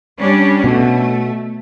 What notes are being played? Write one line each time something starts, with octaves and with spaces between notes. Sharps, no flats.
G3 C#4 D4
B2 A3